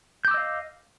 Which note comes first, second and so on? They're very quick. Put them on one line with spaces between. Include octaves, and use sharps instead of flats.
G6 D6 E6 D#5 F5